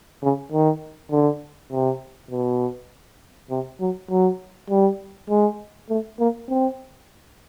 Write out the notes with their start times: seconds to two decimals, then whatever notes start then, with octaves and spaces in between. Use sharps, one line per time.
0.22 C#3
0.52 D#3
1.11 D3
1.72 C3
2.31 B2
3.50 C3
3.80 F#3
4.10 F#3
4.70 G3
5.30 G#3
5.90 A3
6.19 A#3
6.49 C4